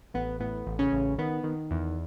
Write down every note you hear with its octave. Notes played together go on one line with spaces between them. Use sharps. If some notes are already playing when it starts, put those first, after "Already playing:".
A1 B3
A2 B3
A1
C#3 C#4
A1
D#3 B3
D#3
E2